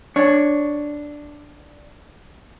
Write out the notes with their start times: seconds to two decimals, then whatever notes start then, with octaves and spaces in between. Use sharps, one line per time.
0.16 D4 C#5